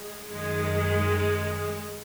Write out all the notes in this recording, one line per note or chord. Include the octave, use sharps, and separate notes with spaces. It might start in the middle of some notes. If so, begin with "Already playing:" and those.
Already playing: G#3
F#2 D#3 G#3